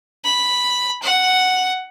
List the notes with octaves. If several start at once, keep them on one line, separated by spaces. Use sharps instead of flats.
B5
F#5